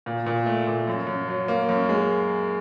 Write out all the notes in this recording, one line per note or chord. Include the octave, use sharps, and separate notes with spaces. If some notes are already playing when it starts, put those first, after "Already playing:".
A#2
A#2
A3
A#2
F#2
F#2
F#3
A#3
F#2
G#3